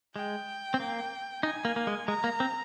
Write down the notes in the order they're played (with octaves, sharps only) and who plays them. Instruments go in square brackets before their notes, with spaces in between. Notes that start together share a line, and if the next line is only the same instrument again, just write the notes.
[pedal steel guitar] G#3 [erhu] G5
[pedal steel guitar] C4
A#3
[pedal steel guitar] D#4 [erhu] G#5
[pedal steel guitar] A#3
A#3
G#3
[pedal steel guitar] G#3 [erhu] A#5
[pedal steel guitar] A#3
C4